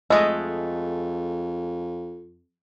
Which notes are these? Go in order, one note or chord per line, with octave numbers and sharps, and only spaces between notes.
F2 G#3 A3 D#5